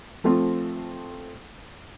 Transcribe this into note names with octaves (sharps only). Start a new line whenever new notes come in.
F3 A3 C4 F4